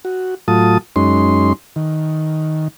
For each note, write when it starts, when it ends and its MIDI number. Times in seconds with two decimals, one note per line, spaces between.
0.05 0.35 66
0.48 0.78 45
0.48 0.78 54
0.48 0.78 65
0.48 0.78 81
0.48 0.78 87
0.96 1.53 42
0.96 1.53 56
0.96 1.53 61
0.96 1.53 63
0.96 1.53 84
1.76 2.68 51